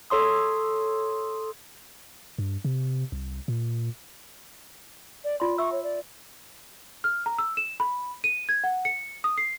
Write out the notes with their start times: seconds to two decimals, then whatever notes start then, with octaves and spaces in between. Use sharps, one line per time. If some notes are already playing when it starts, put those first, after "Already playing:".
0.10 A4 C#5 C6 D#6
2.38 G2
2.65 C3
3.12 C2
3.48 A#2
5.24 D5
5.40 F4 D5 C6
5.58 E5 C#6 E6
5.72 C#5
5.83 D5
7.04 F6
7.26 A#5
7.38 E6
7.57 E7
7.80 B5
8.24 D#7
8.49 G#6
8.64 F#5
8.85 C#7
9.24 D#6
9.38 C7